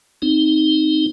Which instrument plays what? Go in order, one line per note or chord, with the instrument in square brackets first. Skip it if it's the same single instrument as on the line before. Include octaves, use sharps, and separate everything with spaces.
[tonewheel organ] C4 D#4